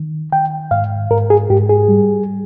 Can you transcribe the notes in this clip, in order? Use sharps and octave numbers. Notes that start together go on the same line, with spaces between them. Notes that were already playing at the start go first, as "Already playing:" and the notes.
Already playing: D#3
D#3 G5
G#2 F5
G#2 A#4
G#4
G#2 G4
G#4
G3